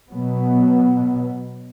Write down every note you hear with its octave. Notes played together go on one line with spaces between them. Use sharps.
B2 F#3 B3